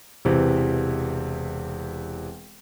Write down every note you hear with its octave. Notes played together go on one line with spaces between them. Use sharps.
E1 C3 E3 C4